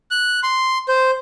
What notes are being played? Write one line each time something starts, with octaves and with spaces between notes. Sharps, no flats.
F#6
C6
C5